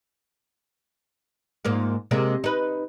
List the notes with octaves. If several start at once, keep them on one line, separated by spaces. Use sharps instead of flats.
G#2 A#3 F4
C3 G#3 A#3
D#4 B4